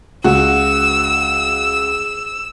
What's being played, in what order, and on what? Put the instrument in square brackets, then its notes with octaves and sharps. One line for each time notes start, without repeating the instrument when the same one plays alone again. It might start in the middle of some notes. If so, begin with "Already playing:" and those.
[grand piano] C#2 [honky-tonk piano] F#4 [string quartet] E6